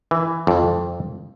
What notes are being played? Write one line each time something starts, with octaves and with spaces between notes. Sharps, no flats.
E3
F2